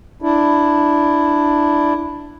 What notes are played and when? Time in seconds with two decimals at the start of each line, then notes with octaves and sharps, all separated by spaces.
0.22 D4 E4